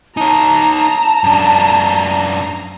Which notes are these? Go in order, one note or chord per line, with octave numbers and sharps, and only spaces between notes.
D#4 C#5 A5 A#5
F#2 D4